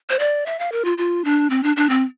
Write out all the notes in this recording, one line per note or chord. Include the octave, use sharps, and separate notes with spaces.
C5
D5
E5
F5
A#4
F4
F4
D4
C4
D4
D4
C4